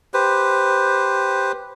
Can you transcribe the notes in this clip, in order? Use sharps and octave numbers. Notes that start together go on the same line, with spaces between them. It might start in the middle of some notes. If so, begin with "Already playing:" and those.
G4 B4 C5